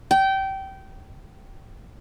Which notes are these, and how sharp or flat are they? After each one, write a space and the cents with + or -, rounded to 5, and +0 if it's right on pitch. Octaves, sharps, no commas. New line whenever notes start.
G5 -20